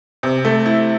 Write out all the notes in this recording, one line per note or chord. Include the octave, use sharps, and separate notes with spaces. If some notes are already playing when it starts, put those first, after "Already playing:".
C3
A3
E4